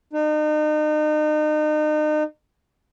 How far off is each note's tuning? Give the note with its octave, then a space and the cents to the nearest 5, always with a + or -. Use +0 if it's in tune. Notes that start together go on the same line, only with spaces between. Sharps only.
D#4 -35